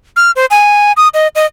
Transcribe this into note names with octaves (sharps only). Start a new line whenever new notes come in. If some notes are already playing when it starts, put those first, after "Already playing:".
F6
C5
G#5
D#6
D#5
D#5